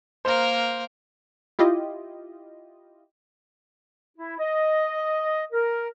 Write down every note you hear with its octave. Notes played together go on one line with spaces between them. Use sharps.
A#3 A#4 C5
E4 F4 G4 D#5
E4
D#5
A#4